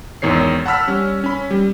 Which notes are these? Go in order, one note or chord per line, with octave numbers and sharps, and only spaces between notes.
G#1 E2 D#3 C#5 C7
F#5 A5 B5 E6 F6 B6
G3 C#4
C#4 B5
G3